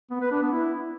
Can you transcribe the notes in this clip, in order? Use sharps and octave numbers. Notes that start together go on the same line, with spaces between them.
B3
B4
D4
B3
E4